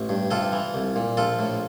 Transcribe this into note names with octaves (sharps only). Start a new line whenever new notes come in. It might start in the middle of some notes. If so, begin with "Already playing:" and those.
Already playing: A1
G2
C3 F4 A4
E3
C2
A#2
A#1 F4 A4
A2